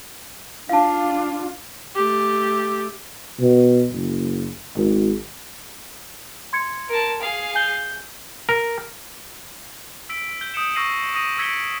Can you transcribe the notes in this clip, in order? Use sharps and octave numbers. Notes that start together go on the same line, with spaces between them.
D4 F4 F5 A5
A3 G4
B2
F#1
G#1
C6 G#6 C#7
A#4 A5
G#4 F5
G#5 G6 G7
A#4
E6 B6 D7
G6 G7
D#6 G6 C#7 D7 E7 G7
C#6 E6 A#6 C7 D#7 F#7
D#6 A#6 D#7
E6 G#6 B6 C#7 D7 G7